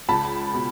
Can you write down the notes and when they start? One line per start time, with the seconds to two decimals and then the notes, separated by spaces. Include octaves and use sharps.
0.09 C#2 A5 B5
0.54 B2